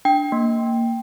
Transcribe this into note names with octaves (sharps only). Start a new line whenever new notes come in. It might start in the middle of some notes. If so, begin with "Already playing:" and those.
D4 G5
A#3